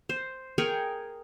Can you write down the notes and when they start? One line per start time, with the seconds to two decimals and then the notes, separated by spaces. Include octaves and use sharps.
0.09 C5
0.58 G#4 A#4 G5 C#6